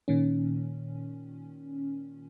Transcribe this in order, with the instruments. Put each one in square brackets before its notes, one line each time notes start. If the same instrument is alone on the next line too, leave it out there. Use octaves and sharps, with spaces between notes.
[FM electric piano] A#2 D#3 C#4